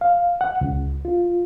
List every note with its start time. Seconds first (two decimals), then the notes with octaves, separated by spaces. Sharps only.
0.01 F5
0.41 F#5
0.61 C#2
1.05 F4